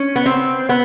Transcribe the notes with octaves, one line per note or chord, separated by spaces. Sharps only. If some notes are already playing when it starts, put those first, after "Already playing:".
Already playing: C#4
B3
C4
B3